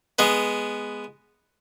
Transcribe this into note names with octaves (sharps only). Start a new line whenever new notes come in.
G#3 B3